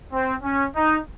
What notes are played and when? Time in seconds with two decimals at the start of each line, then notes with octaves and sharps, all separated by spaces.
0.12 C4
0.43 C#4
0.75 D#4